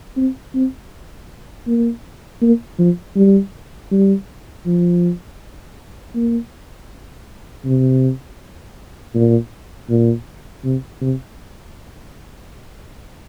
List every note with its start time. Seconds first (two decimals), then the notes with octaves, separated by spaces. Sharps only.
0.17 C4
0.55 C4
1.67 A#3
2.41 A#3
2.79 F3
3.16 G3
3.91 G3
4.66 F3
6.15 A#3
7.65 C3
9.15 A#2
9.89 A#2
10.64 C3
11.01 C3